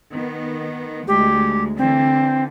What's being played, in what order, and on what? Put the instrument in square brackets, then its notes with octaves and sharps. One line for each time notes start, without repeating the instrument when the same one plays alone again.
[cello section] D#3 B3
[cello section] D2 G#3 [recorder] G4
[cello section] D3 E3 [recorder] C4